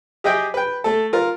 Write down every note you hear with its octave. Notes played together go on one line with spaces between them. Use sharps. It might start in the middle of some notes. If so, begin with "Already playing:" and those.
G4 G#4 D#5 E5 G5
B4 G5
A3 A4
F4 A#4